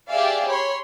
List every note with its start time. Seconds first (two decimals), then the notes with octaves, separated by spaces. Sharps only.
0.10 G4 G#4 D5 E5 F5
0.49 C#5 B5 C6